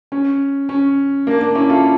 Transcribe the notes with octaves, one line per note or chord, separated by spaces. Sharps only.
C#4
C#4
A#3 D4
A#3 D4
C#4 E4
F4 A4